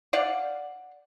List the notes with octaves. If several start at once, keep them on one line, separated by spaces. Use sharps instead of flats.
D5 F5 F#5